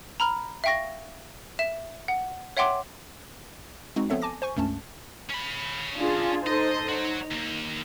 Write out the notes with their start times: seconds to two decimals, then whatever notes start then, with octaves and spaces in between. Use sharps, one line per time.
0.20 A#5 B5 F6
0.64 E5 F5 G5 C#6 A#6
1.59 E5 E7
2.08 F#5
2.57 C#5 E5 F#5 G5 C6 D6
3.96 G#3 C4 D#4 F#4
4.10 F3 B3 C4 A4 C#5 E5
4.22 G#5 A5 D6 A#6
4.42 C5 G#5 C#6
4.56 C#2 G2 A3 C#4 A5
5.30 C#4 B5
5.97 D4 F4 G#4
6.47 D#4 A4 C5 D#5
6.89 D#4 F#4 C#5
7.31 D#2 A#3